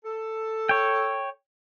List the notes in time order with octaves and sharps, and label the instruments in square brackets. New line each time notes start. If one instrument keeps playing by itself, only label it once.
[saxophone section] A4
[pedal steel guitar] C#5 G5